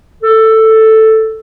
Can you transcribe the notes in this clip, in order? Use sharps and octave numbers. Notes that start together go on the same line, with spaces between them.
A4